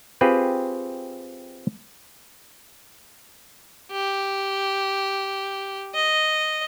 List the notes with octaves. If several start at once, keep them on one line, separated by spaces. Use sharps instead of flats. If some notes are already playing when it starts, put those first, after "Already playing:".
C4 F4 G4 G#4 B4
G4
D#5